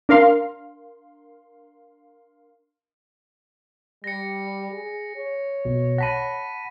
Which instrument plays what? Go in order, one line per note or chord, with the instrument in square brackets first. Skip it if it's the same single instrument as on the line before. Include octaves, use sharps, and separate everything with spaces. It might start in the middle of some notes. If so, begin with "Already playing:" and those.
[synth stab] D4 A#4 F5 C6
[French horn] G3 [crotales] A#6 C#7
[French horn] G#4
C#5
[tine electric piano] B1 B2
[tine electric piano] F#5 A5 B5 [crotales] A#6 B6 D#7